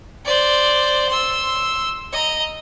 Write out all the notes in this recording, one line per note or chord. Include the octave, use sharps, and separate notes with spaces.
C5 D5
C6 E6
D#5 A#5